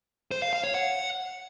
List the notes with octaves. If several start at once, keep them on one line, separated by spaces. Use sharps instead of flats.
C5
F5
F5
C#5
F#5